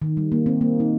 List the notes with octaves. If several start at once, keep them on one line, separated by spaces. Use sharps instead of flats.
D#3
G3
A#3
C4
A#3
D#4